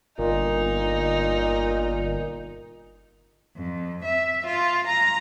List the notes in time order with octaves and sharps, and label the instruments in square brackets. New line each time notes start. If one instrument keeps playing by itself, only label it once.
[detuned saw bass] G1 [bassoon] A#2 [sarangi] D#4
[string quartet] F2
E5
F4
A#5